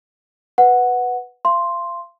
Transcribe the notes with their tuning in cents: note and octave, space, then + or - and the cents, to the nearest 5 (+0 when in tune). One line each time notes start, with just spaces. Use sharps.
B4 +0 F#5 -5
F5 -35 C6 +0